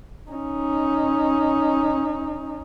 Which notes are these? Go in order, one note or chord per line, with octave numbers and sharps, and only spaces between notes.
C#4 D#4